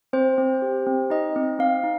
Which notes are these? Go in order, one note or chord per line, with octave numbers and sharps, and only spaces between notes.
C4 C5
C4
G4
C4
D#4 D#5
C4
C4 F5
D#4